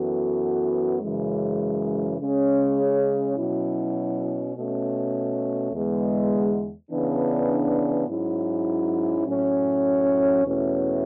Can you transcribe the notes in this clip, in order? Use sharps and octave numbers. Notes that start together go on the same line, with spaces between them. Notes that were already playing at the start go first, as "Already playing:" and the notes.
Already playing: F#2 E3 B3 F#4 A4
F#2 C#3 E3 G#3
C#3 G#3 C#4 G#4
B2 F#3 C#4 E4
B2 A3 C#4
E2 D3 G#3 B3
C#3 E3 B3 D4
G#2 F#3 C#4 E4
A2 F#3 C#4
E2 B2 A3 C#4 E4